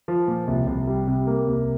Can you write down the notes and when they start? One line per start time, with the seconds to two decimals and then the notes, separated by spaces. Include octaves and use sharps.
0.08 F3
0.28 A#2
0.48 C2
0.67 C2
0.87 G3
1.07 C3
1.27 A#3
1.47 C2